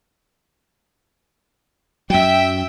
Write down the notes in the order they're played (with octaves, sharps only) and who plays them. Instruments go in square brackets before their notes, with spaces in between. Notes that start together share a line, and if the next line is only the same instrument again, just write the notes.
[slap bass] F#2 F#3 [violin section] E5 G5